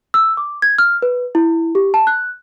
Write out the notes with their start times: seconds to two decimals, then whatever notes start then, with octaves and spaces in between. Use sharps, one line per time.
0.14 E6
0.37 D6
0.62 G#6
0.79 F6
1.02 B4
1.35 E4
1.75 G4
1.94 A5
2.07 F#6